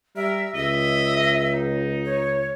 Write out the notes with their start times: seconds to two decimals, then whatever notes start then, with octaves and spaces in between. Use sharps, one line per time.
0.16 G3 A#4 E5
0.55 C#2 D#5 E5
1.54 D#4
2.05 C#5